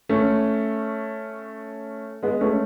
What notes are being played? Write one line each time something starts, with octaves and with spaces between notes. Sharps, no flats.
A3 C#4
G#3 B3
A3 C#4